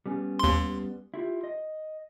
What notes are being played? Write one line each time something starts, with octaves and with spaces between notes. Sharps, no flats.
G3 B3 C#4
D#2 C6
E4 F4 G4
D#5